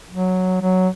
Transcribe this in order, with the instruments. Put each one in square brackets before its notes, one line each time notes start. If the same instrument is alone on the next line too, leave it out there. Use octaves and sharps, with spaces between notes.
[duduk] F#3
F#3